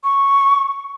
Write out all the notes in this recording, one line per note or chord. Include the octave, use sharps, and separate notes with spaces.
C#6